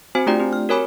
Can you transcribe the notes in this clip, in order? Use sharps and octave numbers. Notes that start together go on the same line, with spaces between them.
C4 F#4 C5 G#5
A3 D4 F4 G4 D5 G5
C4 G4
F6
F#4 A#4 C#5 G#5 B5 D6